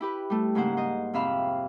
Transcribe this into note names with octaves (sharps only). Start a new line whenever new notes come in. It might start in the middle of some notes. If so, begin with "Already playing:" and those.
E4 G4 B4
G3 A3
G#2 C#3 A#3 C5 F#5
C5 D#5
F2 C3 E5 F5 B5